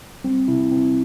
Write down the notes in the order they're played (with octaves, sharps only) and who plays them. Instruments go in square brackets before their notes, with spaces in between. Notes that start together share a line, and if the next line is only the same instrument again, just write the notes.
[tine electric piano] G3 C4
C3 E4
C3 C4